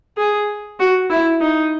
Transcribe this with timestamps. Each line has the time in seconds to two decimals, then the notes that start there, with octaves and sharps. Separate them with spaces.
0.17 G#4
0.79 F#4
1.10 E4
1.41 D#4